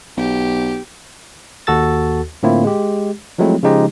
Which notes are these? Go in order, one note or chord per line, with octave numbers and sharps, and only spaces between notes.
B1 G4
D#2 F#4 A4 E6 A6
A2 D3 A#3 C4 E4 F4
G#3 G4
F3 F#3 G#3 A3 C4 E4
C#3 F3 G#3 D#4 G4 D#5